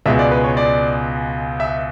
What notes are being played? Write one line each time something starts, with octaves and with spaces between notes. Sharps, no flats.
C#2 B2 G#3 E5
D5
B4
C#5
D5
E5